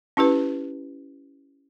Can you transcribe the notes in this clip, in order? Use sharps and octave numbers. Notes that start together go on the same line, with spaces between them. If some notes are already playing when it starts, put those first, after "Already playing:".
C#4 E4 G4 B4